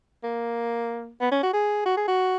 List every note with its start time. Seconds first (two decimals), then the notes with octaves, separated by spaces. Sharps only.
0.24 A#3
1.21 B3
1.32 C#4
1.43 F#4
1.53 G#4
1.86 F#4
1.97 G#4
2.07 F#4